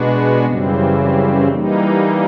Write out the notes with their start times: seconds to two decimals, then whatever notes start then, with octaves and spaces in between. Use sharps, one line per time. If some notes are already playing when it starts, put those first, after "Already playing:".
Already playing: B2 G#3 B3 D4 F#4
0.45 F#2 C#3 E3 G3 C4
1.49 E3 G3 A#3 D#4